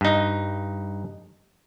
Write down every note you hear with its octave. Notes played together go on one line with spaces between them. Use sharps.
G2 D#4